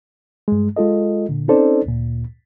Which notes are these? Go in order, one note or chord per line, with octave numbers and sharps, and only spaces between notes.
G2 G#3
G#3 F4 A4 D#5
A#2 D3
C4 C#4 D#4 A4 C5 D5
D2 A#2